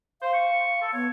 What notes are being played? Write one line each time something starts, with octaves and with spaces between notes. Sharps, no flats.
C5 F5
C#6
A4
B3 C#5